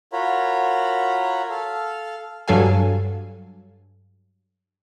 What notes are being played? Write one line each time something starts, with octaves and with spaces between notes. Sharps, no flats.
F4 F#4 A#4 C#5 B5
A4 F5
G2 F#3 A4 F5 G#5